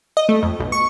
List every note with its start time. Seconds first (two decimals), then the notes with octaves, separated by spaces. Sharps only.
0.17 D#5
0.29 A3
0.43 F2
0.60 B1
0.72 C#6